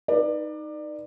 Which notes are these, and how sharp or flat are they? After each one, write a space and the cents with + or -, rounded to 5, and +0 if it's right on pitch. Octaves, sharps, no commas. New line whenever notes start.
D#4 +0 B4 -20 D5 +25